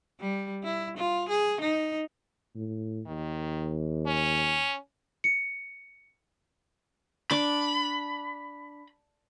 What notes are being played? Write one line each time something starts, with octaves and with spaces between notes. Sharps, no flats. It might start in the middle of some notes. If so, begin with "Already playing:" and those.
G3
E4
F4
G#4
D#4
A2
D#2 D#3
C#4
C#7
D4 B5 D6